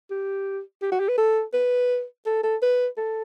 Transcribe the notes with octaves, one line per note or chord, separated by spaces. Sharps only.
G4
G4
F#4
G4
B4
A4
B4
A4
A4
B4
A4